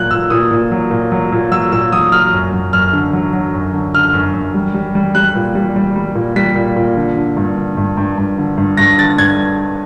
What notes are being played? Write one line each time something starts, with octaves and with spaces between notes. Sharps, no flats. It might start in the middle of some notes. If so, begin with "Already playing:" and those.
Already playing: A#2 F#3 F#6
A#2 E6
A#2 D#6
A#2
F#3
A#2
F#3
A#2
F#3 E6
A#2 E6
F#3 D#6
F#3 F6
F#2
F#2
F#2 F6
D3
F#3
F#3
F#2
D3
D3 F6
F#2
F#2
G3
G3
G3
G3 F#6
A#2
G3
G3
G3
A#2
G3 B6
A#2
A#2
D3
D3
G2
D3
G2
G2
G2
D3
G2
G2 A#6
D3 A6
G2 G#6